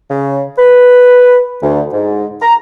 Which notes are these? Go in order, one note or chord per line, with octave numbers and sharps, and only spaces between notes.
C#3
B4
D2
G#2
A#5